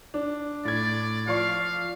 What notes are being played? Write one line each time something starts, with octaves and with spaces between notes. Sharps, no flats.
D4
A2 D5 G#6
F3 D5 F5 C#6